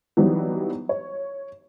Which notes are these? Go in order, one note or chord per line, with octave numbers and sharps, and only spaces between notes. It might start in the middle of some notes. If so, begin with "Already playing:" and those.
E3 F#3 G3 B3 C4 D#4
C#5